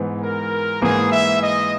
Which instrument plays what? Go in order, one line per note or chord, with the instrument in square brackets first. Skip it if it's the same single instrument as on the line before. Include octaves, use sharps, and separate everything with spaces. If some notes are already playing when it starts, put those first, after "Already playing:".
Already playing: [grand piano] G#2 E3 B3
[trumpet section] A#4
[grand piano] G#2 E3 A#3 [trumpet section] G#4
[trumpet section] E5
D#5